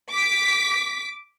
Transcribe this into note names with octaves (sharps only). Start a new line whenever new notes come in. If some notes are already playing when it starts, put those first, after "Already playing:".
D6 B6